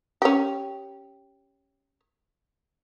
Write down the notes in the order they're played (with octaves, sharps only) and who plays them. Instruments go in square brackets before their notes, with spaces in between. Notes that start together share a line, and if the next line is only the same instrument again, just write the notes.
[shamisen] C#4 G4